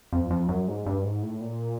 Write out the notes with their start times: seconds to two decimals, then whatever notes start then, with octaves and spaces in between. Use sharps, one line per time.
0.13 F2
0.31 F2
0.49 F#2
0.68 G#2
0.86 G2
1.04 G#2
1.23 A2
1.41 A#2